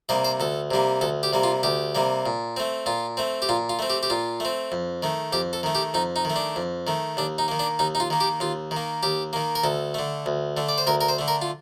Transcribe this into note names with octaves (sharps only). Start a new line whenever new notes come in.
C3 G3 A#3 D#5
C5
D2 A4
C3 G3 A#3
D2 A4
G4
C3 G3 A#3
F4
D2 G4
C3 G3 A#3
A#2
A3 C4
A#2 F4
A3 C4
G4
A#2 F4
F4
A3 C4
G4
G4
A#2 F4
A3 C4
F2
D#3 A3
F2 G4
A4
D#3 A3
G4
F2 D#4
D#4
D#3 A3
D4
F2
D#3 A3
D#2 D4
D#4
D#3 A#3
D4
D#2 D#4
D#4
F4
D#3 A#3
G4
D#2 F4
D#3
A#3
D#2 G4
D#3 A#3
A#4
D2 A4
D3 A3
D2
D3 A3
D5
C5
D2 A#4
A#4
C5
D3 A3
A#4
F4